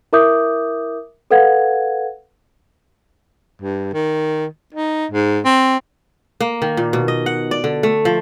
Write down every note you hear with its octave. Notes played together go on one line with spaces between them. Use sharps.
E4 A#4 E5 D6 D#6 G6
A4 B4 F5 F#5 G#6
G2
D#3
D#4
G#2
C4
A#3
D#3
A#2
B2
D#5
F#5
D5
D3
A3
F3